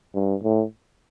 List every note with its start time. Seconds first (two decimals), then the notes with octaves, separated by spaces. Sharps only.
0.15 G2
0.43 A2